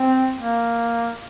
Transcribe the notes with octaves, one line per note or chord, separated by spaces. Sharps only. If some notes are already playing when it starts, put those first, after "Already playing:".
Already playing: C4
A#3